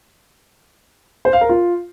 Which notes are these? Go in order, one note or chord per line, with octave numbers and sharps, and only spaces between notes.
C5
F5
A#4
F4